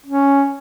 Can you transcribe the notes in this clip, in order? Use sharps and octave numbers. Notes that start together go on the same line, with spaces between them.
C#4